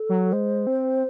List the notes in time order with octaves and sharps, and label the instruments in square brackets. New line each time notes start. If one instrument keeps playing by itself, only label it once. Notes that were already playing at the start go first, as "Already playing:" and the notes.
Already playing: [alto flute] A4
[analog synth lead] F#3
[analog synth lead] G#3 [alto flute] C5
[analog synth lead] C4